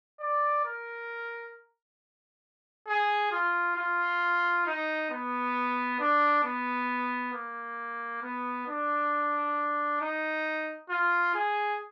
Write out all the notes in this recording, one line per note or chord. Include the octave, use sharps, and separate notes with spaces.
D5
A#4
G#4
F4
F4
D#4
B3
D4
B3
A#3
B3
D4
D#4
F4
G#4